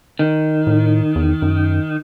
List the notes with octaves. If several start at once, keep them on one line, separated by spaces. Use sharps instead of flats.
D#3
A2
E2
F#2